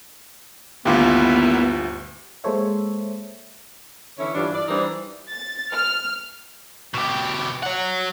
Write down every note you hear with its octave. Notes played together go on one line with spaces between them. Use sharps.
G1 D2 D#3 A#3 B3 E4 F4 G4
G#3 A#3 A4 C5 C#5 E5
D3 E3 C#4 E4 C#5
G2 E3 G3 D4 E4 F4
D5
E3 G3 D4 D#4 A#4 C5
A6
F6
B2 G4
C#5 F#5